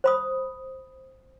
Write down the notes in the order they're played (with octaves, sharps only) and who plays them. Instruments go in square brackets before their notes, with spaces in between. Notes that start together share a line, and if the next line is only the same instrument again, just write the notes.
[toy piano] C5 B5 D#6